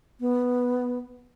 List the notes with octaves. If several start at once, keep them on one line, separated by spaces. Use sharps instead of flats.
B3